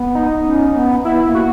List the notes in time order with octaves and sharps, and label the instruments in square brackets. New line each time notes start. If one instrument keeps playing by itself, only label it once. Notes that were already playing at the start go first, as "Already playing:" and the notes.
Already playing: [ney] B3
[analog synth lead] D#4
[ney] C#4
B3
[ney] B3 [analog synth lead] E4
[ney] A#3
[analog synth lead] F#4